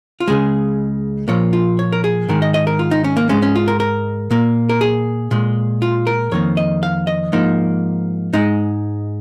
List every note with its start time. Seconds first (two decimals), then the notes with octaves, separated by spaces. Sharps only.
0.20 F4
0.28 C#2 C#3 G#3 G#4
1.28 A#2 F3 A#3 C#5
1.53 F4
1.79 C#5
1.92 A#4
2.04 G#4
2.28 G#2 D#3 G#3 A#4
2.42 D#5
2.54 D#5
2.67 A#4
2.79 F4
2.91 D#4
3.04 C#4
3.17 A#3
3.29 G#2 G#3 C#4
3.42 C#4
3.55 F4
3.68 A#4
3.80 A#4
4.31 A#2 A#3
4.69 A#4
4.81 G#4
5.31 A#2 G#3
5.82 F4
6.07 A#4
6.31 F2 D#3 A#3 C#5
6.57 D#5
6.83 F5
7.07 D#5
7.32 G#2 F3 A#3 D#4
8.33 G#2 G#3 D#4